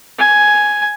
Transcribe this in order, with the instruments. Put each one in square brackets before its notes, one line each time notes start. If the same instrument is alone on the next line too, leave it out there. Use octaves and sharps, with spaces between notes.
[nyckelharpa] G#5